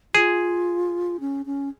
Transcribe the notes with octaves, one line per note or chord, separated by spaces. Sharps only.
F4 G#4
C#4
C#4